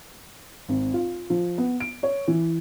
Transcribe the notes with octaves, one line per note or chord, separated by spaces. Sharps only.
G#1
F4
F3
B3
D7
C#5
E3